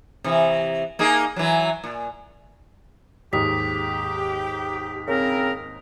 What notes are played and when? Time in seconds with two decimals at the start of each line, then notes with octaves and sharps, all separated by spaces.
0.24 C3 E3
0.99 A#3 D#4 G#4
1.36 E3 F#3
1.84 A#2
3.33 D#2 G#2 G4 D#6 B6
5.08 C#3 C4 A#4